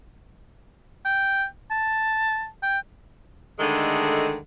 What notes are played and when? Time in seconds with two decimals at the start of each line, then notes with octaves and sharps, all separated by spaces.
1.05 G5
1.71 A5
2.63 G5
3.59 D3 D#3 G#3 A3 G#4 A4